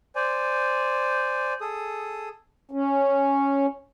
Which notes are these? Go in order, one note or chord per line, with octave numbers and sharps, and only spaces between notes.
C5 D5 G#5
G#4 A4 D#6
C#4